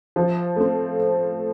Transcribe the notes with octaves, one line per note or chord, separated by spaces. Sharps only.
F3
A3 C4